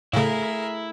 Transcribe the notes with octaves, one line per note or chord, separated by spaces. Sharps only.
A2 C#3 A3 E4 G#4 A#4 E5 F5